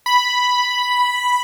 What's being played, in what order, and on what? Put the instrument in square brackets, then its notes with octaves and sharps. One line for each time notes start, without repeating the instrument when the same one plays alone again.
[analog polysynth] B5